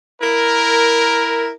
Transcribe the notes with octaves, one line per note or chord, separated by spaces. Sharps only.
E4 A#4